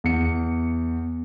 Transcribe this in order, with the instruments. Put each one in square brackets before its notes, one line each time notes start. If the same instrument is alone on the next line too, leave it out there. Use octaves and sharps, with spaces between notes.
[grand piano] E2 C#7